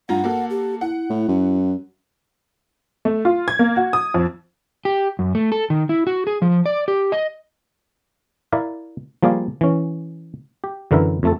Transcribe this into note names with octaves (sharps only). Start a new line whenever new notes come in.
G2 F4 F#5 A#5
A#3 F#4 A4
G4
E4 F#5
A2
F#2
A3
F4
G#6
A#3
F#4
D#6
F2
G4
F#2
A3
A4
D#3
E4
F#4
G#4
F3
D5
G4
D#5
E4 A#4 D5 E5 F5
F3 G3 A#3 G#4 D5 F5
E3 C#4
G4
F#2 D3 E3 A#4 B4 E5
F2 A3 A4